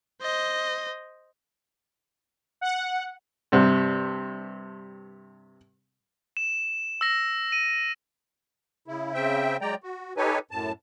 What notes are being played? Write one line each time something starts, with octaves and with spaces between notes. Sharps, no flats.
C5 D#5
F#5
G2 C3
E7
E6 A#6
D#7
C#3 E4
C#3 C4 E5 G5
F#3 G#3 D5 G5 A#5
F#4
D#4 G4 A4 B4 C#5 G#5
F#2 A2 A5